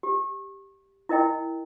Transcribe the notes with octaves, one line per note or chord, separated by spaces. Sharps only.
G4
E4 A#4 D#5 G5